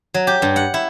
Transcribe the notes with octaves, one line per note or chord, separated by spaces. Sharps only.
F#3
G4
G2
F#5
E4